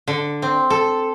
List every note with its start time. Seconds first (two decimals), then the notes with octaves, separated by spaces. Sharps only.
0.07 D3
0.42 C4
0.70 A4